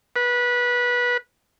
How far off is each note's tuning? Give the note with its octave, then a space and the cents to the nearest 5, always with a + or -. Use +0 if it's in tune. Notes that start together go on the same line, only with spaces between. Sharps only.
B4 -20